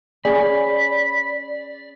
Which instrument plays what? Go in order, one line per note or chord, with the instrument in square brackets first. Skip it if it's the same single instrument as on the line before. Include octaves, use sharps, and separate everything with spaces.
[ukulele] C#4 G#4 [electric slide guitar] D5 [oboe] B5